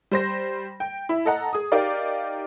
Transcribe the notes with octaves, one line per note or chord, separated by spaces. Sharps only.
G3 C5 A#6
G5
E4
A4 D#5 F#5 A#5
G#4 D#6
D#4 G4 A#4 D5 F5